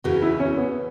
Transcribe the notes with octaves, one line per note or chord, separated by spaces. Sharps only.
E2 C#3 E3 F#4
E4
C#4
B3